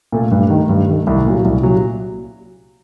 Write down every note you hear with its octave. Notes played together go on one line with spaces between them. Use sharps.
A#2 A3
G2
D#3 A3
G2
D#3 A3
C2
A#2 F#3
C2
A#2 F#3